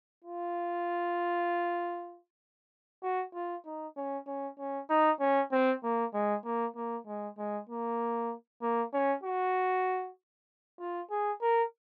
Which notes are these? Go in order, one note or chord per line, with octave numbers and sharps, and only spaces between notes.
F4
F#4
F4
D#4
C#4
C#4
C#4
D#4
C#4
C4
A#3
G#3
A#3
A#3
G#3
G#3
A#3
A#3
C#4
F#4
F4
G#4
A#4